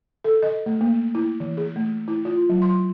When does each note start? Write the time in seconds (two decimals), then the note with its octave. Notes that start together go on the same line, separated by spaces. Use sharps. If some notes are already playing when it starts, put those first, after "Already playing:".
0.24 A4
0.42 D#5
0.66 A3
0.81 A#3
1.15 E4
1.40 E3
1.57 G#4
1.76 A3
2.08 E4
2.25 F4
2.49 F#3
2.62 C6